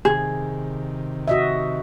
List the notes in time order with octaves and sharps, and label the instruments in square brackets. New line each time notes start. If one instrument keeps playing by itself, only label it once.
[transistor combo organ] C3 D#3 [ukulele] G#4
[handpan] F#4 D#5 E5